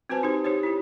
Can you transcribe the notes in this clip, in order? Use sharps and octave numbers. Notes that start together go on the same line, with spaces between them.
C4 F#4 B4 C5 G#5 A5
D#4 G4 C5
D#4 G4 C5 C#5
E4 G4